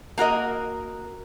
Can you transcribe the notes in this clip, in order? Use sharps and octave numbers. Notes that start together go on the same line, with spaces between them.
A#3 F#4 A#4 D#5